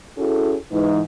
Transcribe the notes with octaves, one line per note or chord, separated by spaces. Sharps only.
C#4 E4 F#4 G#4 A4
G#2 E3 D#4